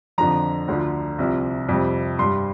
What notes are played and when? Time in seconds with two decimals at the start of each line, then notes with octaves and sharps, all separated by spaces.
0.18 F2 D3 F3 A#5
0.68 D2 D3 F3
1.18 C2 C3 F3
1.69 F2 C3 G3
2.18 G2 G3 C6